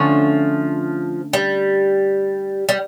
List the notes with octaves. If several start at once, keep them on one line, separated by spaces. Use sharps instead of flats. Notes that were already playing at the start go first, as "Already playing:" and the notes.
Already playing: D3 F3 A3 C#4
G3
G3